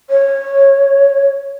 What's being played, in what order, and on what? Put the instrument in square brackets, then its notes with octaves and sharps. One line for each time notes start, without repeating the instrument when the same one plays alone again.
[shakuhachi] C#5